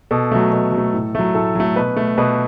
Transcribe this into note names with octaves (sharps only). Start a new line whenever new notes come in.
B2 A4
F#3 A3
B2
F#3
A3
A2
F#3 A3
A2 A4
F#3 A3
B2 B4
A3
B2 B4